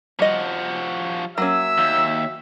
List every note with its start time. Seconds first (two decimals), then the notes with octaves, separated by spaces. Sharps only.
0.19 F3 G3 F#4 D#5
1.38 F#3 A#3 C#4 E5 E6
1.78 D#2